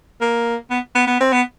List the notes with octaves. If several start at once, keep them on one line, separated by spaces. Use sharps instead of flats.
A#3
B3
B3
B3
C4
B3